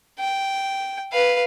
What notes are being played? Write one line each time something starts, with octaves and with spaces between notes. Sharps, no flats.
G5
B4 F5